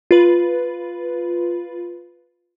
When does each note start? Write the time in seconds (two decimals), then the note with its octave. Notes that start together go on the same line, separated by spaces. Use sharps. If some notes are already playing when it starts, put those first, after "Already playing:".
0.11 F4 B4